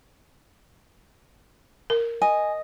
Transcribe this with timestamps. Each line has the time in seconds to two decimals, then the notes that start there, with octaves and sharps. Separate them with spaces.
1.90 A#4
2.22 D#5 G#5